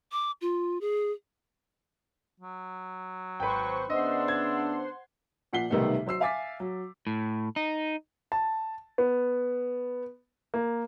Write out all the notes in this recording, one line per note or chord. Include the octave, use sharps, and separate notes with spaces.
D6
F4
G#4
F#3
G#1 B4 C5 G5 C#6
C#3 B3 D4 C5 D#5 E5 F#5 C6
G#6
A#2 F3 F#5 B6 C7 G7
B1 C3 D#3 G3 A3 B3
F#3 C5 E6 C7
E5 F5 G#5 D6 A6 B6
F#3
A2
D#4
A5
B3
A#3